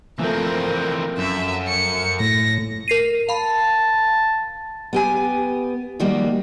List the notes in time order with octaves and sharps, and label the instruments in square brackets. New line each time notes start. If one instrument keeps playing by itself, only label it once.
[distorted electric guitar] E3 C4 [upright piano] F3 A3 [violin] A#4
[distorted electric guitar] F#2 [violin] E5
[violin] C#7
[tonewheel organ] A2 [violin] A#6
[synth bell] A#4 C7 D#7
[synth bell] F5 B5 [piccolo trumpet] A5
[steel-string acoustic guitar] B3 G4 G#5
D#3 F3 G3 A#3 F#4 G4